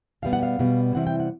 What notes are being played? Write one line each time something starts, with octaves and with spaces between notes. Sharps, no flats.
B2 G3 B3 F5
F#5
F5
B2 G3 B3
C3 E3 G3 C4 E4 F#5
G5
F#5